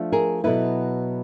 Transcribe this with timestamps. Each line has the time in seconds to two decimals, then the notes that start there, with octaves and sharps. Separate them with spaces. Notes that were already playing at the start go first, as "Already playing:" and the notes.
Already playing: F3 A3 D4 F4
0.12 G#4 A#4
0.44 B2 F#3 B3 E4 A4 B4